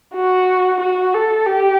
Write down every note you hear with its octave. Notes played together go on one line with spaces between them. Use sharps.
F#4
F#4
A4
G4